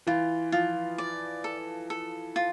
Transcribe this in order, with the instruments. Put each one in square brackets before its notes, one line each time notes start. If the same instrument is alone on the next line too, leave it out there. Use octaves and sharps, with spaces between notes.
[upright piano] E3 [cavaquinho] F4
[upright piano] F3 [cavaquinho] F4
[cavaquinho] D5
A4
A4
F4